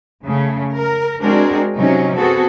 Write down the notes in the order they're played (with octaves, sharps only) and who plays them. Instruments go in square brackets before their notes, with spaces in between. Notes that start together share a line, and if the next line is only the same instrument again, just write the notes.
[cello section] C#3 A3
A#4
G#3 C4 D4 F#4 G#4 A#4
C3 F#3 C#4 D#4
B3 C4 F#4 G#4 A4